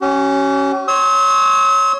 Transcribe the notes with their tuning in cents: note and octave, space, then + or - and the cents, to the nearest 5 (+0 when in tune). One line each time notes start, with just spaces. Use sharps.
C#4 +0 G4 -45
C#5 +0 C6 +15 E6 -45